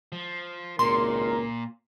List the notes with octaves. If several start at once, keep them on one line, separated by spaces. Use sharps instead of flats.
F3
G#1 C#2 A#2 A#4 C6